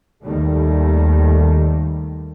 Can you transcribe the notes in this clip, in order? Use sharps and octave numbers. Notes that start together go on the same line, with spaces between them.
D#2 D#3 G3 A3